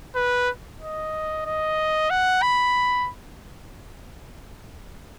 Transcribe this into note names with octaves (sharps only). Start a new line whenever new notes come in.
B4
D#5
D#5
F#5
B5